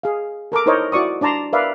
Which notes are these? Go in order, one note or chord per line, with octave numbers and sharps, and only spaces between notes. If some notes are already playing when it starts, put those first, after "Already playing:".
G#4 F5
A4 A#4 A5 D6
D#4 E4 A#4 C5 C#5 D#5
E4 F#4 D5 C#6 D#6
D4 D5 A5 A#5 C6
A#4 B4 D5 E5 F5